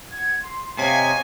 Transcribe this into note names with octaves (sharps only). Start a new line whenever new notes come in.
F#5 G#6
C6
C3 C#5 D#5 F5 G#5